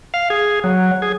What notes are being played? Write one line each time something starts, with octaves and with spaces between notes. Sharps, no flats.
F5
G#4
F#3
G#4